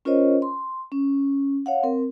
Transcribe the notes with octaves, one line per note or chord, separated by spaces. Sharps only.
C#4 F4 A#4 C5 C#5 D#5
C6
C#4
C#5 F5 F#5
C4 A#4